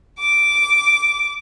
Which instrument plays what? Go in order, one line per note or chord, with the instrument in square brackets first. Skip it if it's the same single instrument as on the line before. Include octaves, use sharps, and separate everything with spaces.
[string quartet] D6